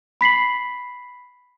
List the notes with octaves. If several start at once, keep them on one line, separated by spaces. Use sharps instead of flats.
B5 B6 C7 F#7